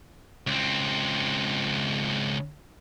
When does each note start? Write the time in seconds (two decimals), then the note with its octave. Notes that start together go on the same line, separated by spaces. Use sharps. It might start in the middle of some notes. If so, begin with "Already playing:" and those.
0.47 C#2 C4